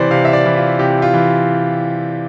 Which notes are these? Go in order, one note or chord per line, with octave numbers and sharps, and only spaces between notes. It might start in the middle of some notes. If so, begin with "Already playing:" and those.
Already playing: C3 E3 C5 D5
C3 F5
E5
D5
E3
F4
C3 G4
F4
E3